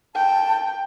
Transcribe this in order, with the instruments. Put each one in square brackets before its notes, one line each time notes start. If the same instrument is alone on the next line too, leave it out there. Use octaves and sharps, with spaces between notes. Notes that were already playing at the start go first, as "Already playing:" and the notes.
[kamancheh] G5 [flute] A5